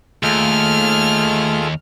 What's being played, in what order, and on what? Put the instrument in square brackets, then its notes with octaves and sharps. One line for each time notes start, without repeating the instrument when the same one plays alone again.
[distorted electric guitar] D#2 [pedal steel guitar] A3 [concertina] F4 G#4 A4 [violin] F6